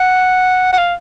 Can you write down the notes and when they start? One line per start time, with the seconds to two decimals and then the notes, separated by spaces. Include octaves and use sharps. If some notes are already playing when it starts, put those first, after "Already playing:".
Already playing: F#5
0.73 F#5
0.78 F5